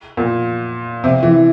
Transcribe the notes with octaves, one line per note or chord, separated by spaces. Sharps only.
A#2
C3
E3